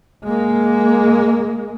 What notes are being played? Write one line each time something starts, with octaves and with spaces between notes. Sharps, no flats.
G#3 A#3